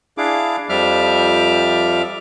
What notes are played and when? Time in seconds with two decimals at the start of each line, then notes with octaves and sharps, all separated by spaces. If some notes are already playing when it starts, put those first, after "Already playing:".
0.18 D4 E4 G#4 F5 D6
0.69 F2 F3 G3 E5 D6 F6